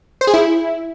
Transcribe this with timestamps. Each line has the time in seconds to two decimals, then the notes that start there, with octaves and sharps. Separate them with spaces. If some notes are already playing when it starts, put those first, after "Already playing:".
0.21 C5
0.27 G#4
0.34 E4